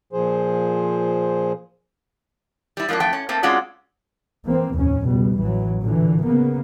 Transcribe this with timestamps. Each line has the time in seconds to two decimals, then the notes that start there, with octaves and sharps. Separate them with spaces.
0.13 A#2 F3 G#4 C5
2.77 G3 E4
2.89 F3 G#3 A#3 C#4 D4
3.00 F2 A3 G5
3.13 C#4
3.29 A3 A#3 C4
3.43 G#3 C4 C#4 F4 F#4 D5
4.45 E3 A#3 C4
4.73 F1 D#2 A2 C#4
5.04 C#2 B2 G3
5.36 A1 E3 F#3
5.81 A#2 D3 E3
6.26 C#3 A#3 B3